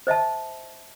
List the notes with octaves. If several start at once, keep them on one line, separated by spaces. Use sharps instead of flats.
C5 D#5 E5 A5